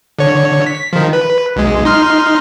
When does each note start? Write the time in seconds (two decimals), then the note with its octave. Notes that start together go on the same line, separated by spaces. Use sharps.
0.19 D3 C#5
0.66 B6
0.93 D#3 F3
1.13 B4
1.56 B1 G#3
1.85 D#4 C6 F6